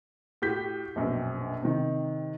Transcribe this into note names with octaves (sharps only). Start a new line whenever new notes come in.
A2 F#4 G4 G6 B6
A#1 F#2 B2
C3 D#3